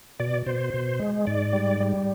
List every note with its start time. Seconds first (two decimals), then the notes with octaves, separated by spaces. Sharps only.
0.20 B2 D5
0.46 B2 C5
0.74 B2
0.99 G#3
1.27 G#2 D5
1.53 G3
1.80 G3